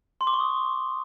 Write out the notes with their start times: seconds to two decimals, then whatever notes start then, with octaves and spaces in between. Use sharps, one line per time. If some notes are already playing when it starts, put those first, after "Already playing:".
0.21 C6
0.27 D6
0.34 C#6
0.40 D#6